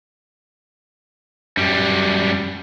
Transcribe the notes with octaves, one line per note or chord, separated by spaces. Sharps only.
F#2 G3